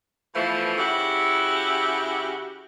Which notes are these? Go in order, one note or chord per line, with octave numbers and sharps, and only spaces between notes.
B2 E3 F3 A3
C#3 E4 F#4 G4